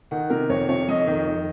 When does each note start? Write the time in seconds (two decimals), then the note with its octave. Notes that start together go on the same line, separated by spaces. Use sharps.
0.11 D#3 F#5
0.30 C3 A#4
0.49 F2 C#5
0.69 C3 C#5
0.88 F2 D#5
1.07 D#3
1.26 D#3